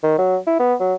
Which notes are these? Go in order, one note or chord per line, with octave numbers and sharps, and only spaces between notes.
D#3
F#3
E4
B3
F#3